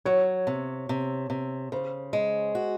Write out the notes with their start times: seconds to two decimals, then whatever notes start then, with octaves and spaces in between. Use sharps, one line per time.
0.05 F#3 C#5
0.47 C3
0.89 C3
1.30 C3
1.72 C#3 C5
2.13 G#3
2.55 F#4